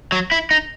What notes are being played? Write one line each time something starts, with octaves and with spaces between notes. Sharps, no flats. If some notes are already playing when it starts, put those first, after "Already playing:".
F#3
E4
D#4